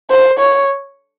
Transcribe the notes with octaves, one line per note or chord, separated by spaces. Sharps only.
C5
C#5